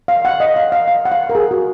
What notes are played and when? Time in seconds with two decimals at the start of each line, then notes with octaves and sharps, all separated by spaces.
0.08 F5
0.25 F#5
0.40 D#5
0.56 F5
0.72 F5
0.88 F5
1.05 F#5
1.12 F5
1.30 A#4
1.35 G#4
1.51 F#4